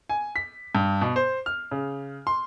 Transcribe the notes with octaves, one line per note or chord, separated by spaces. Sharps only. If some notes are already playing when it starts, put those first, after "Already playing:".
G#5
B6
G2
B2
C5
F6
C#3
C6